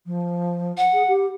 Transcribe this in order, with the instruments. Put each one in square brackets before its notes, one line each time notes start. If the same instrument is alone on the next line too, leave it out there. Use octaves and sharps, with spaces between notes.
[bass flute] F3
[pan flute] F#5
[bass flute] G#4
G4